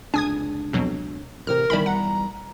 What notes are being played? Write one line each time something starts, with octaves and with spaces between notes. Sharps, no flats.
F1 C#2 D4 G#5 D#6 G#6
F2 B2 F#3
A1 C3 A#4 F6
B1 D#3 E3 G3 B5
F#5 A#5